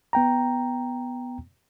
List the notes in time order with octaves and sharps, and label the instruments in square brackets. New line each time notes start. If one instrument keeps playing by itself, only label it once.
[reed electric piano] B3 G5 A#5